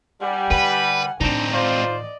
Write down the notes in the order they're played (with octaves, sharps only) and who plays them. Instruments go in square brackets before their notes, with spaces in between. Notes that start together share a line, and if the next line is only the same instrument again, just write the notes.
[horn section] G3 [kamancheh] F#5 G#5
[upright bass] D3 [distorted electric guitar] B4
[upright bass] A2 D#3 [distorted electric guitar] C4 D#4 [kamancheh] D4
[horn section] F4 C5 [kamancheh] D5 D#5